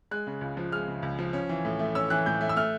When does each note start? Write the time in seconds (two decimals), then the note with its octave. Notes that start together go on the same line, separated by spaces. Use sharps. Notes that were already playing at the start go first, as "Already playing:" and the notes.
0.11 G#3 F#6
0.27 C#3
0.41 C#2
0.57 F3
0.72 G#3 F6
0.88 C#3
1.03 C#2
1.19 F3
1.33 C#4
1.49 E3
1.65 A2
1.79 A3
1.95 C#4 E6
2.10 E3 F#6
2.26 A2 G6
2.41 A3
2.49 E6
2.56 A3 F6